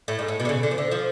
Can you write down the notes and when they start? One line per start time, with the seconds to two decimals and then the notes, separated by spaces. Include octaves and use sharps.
0.08 A2
0.19 G#2
0.28 A2
0.40 B2
0.45 D3
0.49 C#3
0.63 D3
0.71 F3
0.78 D3
0.91 F3